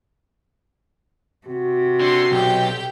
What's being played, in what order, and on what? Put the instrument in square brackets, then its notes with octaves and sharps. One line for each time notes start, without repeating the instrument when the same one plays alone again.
[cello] C3 [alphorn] F#4
[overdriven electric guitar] D3 [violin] C6
[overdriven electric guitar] B1 [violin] G4 G5